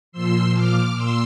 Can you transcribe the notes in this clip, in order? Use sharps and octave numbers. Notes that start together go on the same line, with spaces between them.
A#2 F3 C6 E6
D6 F6
A#2 C6 E6